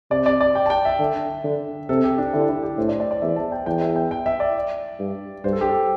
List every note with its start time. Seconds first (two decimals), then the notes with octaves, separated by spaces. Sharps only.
0.11 C3 D5
0.26 D5
0.41 D5
0.55 G5
0.66 A5
0.70 G5
0.85 E5
0.99 D3
1.44 D3
1.89 C3 A4
2.04 G4
2.18 D4
2.33 D3 E4
2.49 E4
2.63 G4
2.78 A2 C5
2.89 D5
3.00 D5
3.11 D5
3.22 E2 E5
3.36 A5
3.52 G5
3.66 E2 G5
3.81 E5
3.96 G5
4.11 G5
4.26 E5
4.40 D5
4.99 G2
5.44 G2 C5
5.53 A4
5.61 G4
5.69 A4